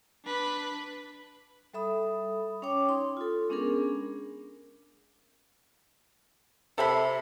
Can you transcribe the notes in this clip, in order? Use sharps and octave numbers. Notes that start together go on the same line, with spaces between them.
D4 B4
G3 A4 E5 B5 D#6
C#4 C#5 G5 D6
D#4 C6
F4 A4
G#3 B3 C#4 D4 G#4 A#4
C3 A4 E5 B5